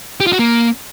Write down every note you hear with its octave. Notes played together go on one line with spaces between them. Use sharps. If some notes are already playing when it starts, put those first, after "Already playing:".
G4
F4
F#4
A#3